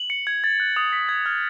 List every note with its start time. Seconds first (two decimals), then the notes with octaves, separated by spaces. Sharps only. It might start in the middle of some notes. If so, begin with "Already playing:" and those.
Already playing: F#7
0.10 C#7
0.27 G#6
0.44 A6
0.60 F#6
0.76 D#6
0.93 B6
1.09 G#6
1.26 F6